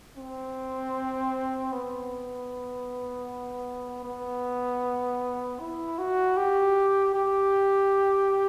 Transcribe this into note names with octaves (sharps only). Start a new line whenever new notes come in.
C4
B3
B3
E4
F#4
G4
G4